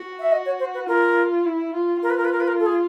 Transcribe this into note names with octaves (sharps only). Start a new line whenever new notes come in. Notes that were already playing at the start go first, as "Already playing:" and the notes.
Already playing: F#4
E5
D#5
C#5
C5
B4
F4 A#4
E4
F4
F4 A#4
B4
A#4
B4
A#4
B4
A#4
A4
G#4